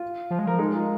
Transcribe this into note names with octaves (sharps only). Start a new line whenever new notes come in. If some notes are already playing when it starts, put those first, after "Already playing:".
Already playing: F4
F3
G#3
F3 A#4
G#3 D#4 G#4
F4 A#4